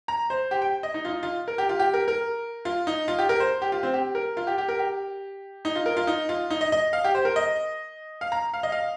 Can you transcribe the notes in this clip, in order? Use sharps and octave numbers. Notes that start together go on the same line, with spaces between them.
A#5
C5
G4
G5
D#5
D#4
F4
D#4
F4
A#4
G4
F4
G4
A#4
A#4
F4
D#4
F4
G4
A#4
C5
G4
F4
C4
G4
A#4
F4
G4
G4
A#4
G4
D#4
F4
A#4
F4
D#4
F4
D#4
D#5
D#5
F5
G4
C5
A#4
D#5
F5
A#5
F5
D#5
F5